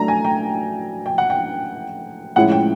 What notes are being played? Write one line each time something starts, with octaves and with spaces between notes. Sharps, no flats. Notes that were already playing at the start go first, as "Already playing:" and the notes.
Already playing: F#3 A3 D4 A#5
G#5
G5
G5
F#5
G5
A2 F3 G#3 C#4 E4 F#5
G5